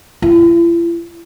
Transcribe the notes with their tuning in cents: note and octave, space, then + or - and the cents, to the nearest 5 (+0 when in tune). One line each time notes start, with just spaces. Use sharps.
E4 +45